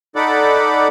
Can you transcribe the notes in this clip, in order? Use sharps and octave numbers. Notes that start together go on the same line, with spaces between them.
D#4 A4 D5 F#5 B5 D6